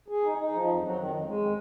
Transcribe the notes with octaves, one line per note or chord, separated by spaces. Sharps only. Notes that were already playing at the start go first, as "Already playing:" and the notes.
G#4
D#4
D#4
F3
F2
F#3
D#3
F2
G#3